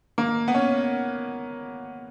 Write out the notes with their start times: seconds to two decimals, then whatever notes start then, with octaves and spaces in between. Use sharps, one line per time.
0.18 A#3
0.48 B3
0.54 C#4